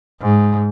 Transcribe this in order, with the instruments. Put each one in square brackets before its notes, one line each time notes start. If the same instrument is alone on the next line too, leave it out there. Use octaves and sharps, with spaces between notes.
[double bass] G#2